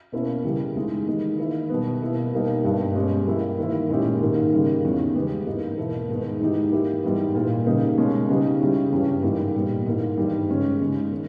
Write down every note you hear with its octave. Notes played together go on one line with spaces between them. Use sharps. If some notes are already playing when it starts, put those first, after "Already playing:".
B2 A#3 C#4 E4
C#3 E3 G3
E3 G#3 D#4 G4
D#3 G#3 D#4
D#3 A#3 E4
B2 G3 B3
B2 A#3 E4
B2 G3 A#3 D#4
G2 G3 B3 G4
B2 G#3 C#4 G4
E3 G3 A#3 E4
D#3 A#3 E4
A#2 G#3 C#4 E4 G4
G#2 D#3 A#3
C#3 G3 A#3
E2 D#3 G3 C#4 E4
C#3 G#3 B3 G4
G#2 E3 A#3 D#4
E2 B2 A#3 E4
G#2 D#3 G#3 B3
G#2 E3 G#3 D#4 G4
E3 A#3 E4 G4
G#2 G3 B3 E4
A#2 A#3 E4
C#3 G3 A#3 D#4 G4
B2 G#3 C#4
C#3 G3 B3 D#4 G4
C#3 G3 C#4 E4
G2 E3 G3 C#4 G4
G#2 G3 A#3 E4 G4
A#2 G3 B3
G#2 E3 A#3
G2 D#3 G3
C#3 G#3 C#4 G4
C#3 G#3 D#4
D#3